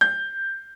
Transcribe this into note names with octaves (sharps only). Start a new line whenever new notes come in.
G6